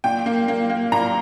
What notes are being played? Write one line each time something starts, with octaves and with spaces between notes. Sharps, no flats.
A#2 G5
A#3
A#3
A#3
A#2 A#5